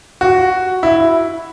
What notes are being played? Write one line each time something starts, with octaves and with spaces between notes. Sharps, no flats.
F#4
E4